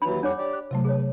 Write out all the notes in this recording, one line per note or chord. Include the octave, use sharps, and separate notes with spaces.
D#2 E3 F#3 D4 B5
F2 G3 D4 C#5 F#5 D6
G4 D5
F#6
C3 F#3 A3 F4
G#4 B4 C#5